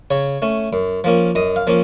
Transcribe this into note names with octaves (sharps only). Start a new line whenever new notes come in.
C#3 C#5
A3 C#4
F#2
F3 A#3 C#4
F#2 D#5
F5
F3 A#3 C#4